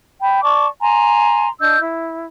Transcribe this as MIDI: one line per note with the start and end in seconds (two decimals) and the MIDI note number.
0.20 0.42 79
0.20 0.42 83
0.43 0.67 74
0.43 0.67 81
0.43 0.67 85
0.43 0.67 86
0.81 1.49 80
0.81 1.49 82
0.81 1.49 84
1.61 1.79 62
1.61 1.79 75
1.61 1.79 88
1.61 1.79 91
1.80 2.25 64